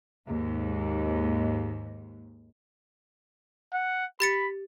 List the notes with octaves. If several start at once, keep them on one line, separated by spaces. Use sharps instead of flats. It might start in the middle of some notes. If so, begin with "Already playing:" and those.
D#2 G#2
F#5
G4 B5 A6 C#7